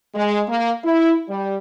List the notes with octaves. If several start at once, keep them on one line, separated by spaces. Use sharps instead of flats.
G#3
A#3
E4
G3